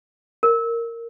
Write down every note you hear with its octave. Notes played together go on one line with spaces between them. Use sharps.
A#4